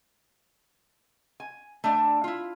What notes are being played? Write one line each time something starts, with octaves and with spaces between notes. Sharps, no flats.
G#5
A3 D4 D5
E4 F4